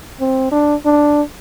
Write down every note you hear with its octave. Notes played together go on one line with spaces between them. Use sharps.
C4
D4
D4